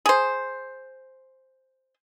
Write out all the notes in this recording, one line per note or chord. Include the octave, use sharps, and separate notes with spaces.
G#4 C5